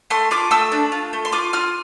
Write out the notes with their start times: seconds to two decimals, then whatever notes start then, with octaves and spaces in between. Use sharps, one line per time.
0.10 A3 C6
0.31 F4 D6
0.51 A3 E6
0.72 D4
0.92 F4
1.13 A3
1.25 C6
1.32 F4 D6
1.53 F4 F6